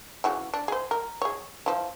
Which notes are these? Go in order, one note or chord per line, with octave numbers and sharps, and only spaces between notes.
C#3 E3 F#4
D4
G#4 C5
A#4
G#4 C#5
E3 F3